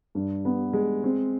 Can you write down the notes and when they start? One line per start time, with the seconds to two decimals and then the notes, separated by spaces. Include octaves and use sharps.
0.15 G2
0.45 B3
0.73 G#3
1.04 C4